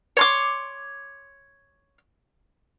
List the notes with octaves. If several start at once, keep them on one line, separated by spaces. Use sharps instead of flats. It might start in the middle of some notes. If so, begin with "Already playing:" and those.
C#5 C6 D6